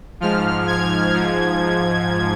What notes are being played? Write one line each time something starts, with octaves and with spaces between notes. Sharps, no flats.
G#2 F3 F6
G#6
G#2 F3